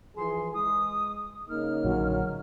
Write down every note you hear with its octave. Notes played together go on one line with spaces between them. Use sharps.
E3 F3 G#4 C6
G#3 D#6
C#3 A#3 D#4 F6
A#1 A#2 D3 F#3